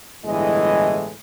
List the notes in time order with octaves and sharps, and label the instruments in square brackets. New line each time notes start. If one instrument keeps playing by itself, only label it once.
[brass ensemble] G1 A2 E3 G#3 D#5